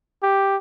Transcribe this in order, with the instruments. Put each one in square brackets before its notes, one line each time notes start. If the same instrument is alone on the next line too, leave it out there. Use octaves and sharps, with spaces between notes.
[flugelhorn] G4